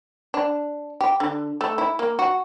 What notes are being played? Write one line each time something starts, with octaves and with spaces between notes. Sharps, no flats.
D4
G4
D3
A3
E4
A#3
F#4